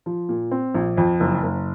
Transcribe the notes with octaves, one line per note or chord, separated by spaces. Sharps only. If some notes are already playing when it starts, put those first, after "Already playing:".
F3
A#2
C4
A#1
F2
F#1
F#1